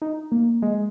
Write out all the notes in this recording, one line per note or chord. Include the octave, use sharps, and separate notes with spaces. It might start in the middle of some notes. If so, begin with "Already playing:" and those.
D#4
A#3
G#3